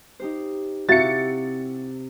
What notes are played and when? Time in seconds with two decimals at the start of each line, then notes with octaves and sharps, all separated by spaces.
0.19 D#4 G4 C5
0.89 C3 E4 F#4 G4 F5 A6 C#7